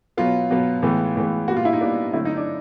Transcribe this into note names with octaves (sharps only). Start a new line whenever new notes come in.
B2 F#3 B3 F4
B2 F#3 B3
A2 E3 G#3 B3
A2 E3 G#3 B3
A#2 G3 B3 F#4
F4
E4
D#4
A#2 G3 B3 D4
D3 F#3 A3 C4 E4
D#4
D4